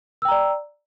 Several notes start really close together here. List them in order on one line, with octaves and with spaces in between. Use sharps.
E6 G5 A#5 D5